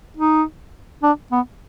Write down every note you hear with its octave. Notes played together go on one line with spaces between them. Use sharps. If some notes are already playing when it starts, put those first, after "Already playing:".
D#4
D4
B3